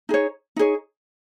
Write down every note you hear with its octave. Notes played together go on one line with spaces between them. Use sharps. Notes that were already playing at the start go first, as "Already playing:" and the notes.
D#4 G#4 C#5
D#4 G#4 C#5